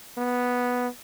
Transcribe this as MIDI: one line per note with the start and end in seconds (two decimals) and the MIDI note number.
0.18 0.88 59